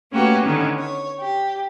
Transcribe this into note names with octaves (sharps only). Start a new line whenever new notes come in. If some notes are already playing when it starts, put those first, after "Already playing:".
A3 A#3 C#4 F#4 G4 B4
D3 D#3 B3 C#4
C#5
G4